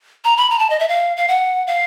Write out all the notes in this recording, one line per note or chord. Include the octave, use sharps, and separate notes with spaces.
A#5
B5
A#5
A5
D#5
E5
F5
F5
F#5
F5